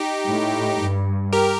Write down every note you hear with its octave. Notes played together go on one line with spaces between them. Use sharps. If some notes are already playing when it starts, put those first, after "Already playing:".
Already playing: D#4 G4
A2
G2
G4 A#4